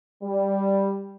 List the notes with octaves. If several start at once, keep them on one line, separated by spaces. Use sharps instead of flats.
G3